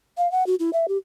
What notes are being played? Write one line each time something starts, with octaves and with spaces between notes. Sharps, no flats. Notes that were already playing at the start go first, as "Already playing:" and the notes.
F5
F#5
F#4
E4
E5
G4